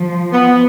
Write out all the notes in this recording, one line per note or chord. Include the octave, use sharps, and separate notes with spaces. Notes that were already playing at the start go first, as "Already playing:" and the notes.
Already playing: F3
B3